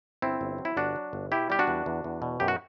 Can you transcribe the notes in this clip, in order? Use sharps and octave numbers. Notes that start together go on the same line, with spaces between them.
G1 C4 E4
G1
F#3
E4
G1 D4 F#4
F#3
G1
B2 E4 G4
G3 G4
D4 F#4
E2
E2
E2
B2
F#2 G4
F#4